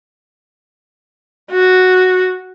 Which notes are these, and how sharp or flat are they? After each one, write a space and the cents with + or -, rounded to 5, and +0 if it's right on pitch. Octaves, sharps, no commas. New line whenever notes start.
F#4 +0